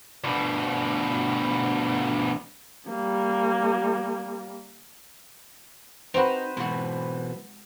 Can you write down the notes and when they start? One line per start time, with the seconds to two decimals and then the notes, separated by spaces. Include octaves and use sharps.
0.24 D2 B2
2.88 G3 A#3
6.14 C4 D#4 F#4 B4 C5 F7
6.57 B2 E3 F#3 G#3 F#4